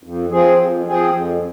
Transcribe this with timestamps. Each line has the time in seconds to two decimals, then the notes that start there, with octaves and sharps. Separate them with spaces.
0.03 F2
0.31 F3 C4 G#4
0.59 F2
0.88 F3 C4 G#4
1.15 F2